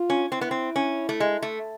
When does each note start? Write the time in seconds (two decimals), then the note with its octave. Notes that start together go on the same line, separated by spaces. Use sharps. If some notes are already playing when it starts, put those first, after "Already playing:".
Already playing: F4
0.10 C#4
0.32 C4 E4
0.41 B3
0.51 C4
0.76 C#4
1.09 A3
1.20 G#3
1.42 A3